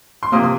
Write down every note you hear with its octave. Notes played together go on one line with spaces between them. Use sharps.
C6
C3 F3 A#3 D#6
D#6